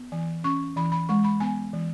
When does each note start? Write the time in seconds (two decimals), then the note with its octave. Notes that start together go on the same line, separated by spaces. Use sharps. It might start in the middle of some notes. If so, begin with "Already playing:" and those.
Already playing: B3
0.12 E3 G#5
0.44 C#4 C#6
0.76 E3 B5
0.92 B5
1.09 G#3 C#6
1.24 B5
1.40 B3 G#5
1.73 E3